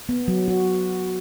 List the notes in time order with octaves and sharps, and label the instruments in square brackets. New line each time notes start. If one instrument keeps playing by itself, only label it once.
[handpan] B3
F#3
F#4